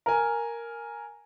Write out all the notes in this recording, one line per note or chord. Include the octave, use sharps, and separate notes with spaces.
A#4 G#5